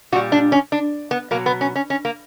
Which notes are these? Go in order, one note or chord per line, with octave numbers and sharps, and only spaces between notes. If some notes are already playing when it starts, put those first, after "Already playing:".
A#2 G3 F#4
D4
C#4
D4
B3
B2 F#3 A#3
B3
C#4
C#4
C#4
A#3